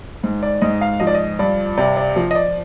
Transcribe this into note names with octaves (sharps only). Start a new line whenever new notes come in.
G#2
D5
G#2 D#5
F5
F3 D#5
D5
D#5
G2 D5
C3 D5
D5
F3
D#5
D5